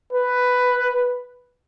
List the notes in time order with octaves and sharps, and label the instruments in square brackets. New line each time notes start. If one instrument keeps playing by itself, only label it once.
[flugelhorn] B4